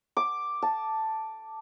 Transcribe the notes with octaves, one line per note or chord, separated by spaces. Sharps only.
D6
A5